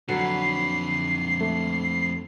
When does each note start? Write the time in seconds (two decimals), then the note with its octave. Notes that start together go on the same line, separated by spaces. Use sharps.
0.08 F2 D3 F#3 B4 C7
1.41 A3